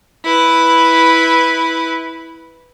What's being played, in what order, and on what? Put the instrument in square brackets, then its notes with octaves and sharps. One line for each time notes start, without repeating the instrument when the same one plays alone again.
[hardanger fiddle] E4 B4